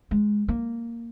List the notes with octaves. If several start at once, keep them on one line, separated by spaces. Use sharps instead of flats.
G#3
A#3